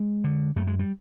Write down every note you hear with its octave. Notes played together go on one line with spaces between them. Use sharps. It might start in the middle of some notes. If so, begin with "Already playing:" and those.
Already playing: G#3
D3
F#2 A3
G#3
G3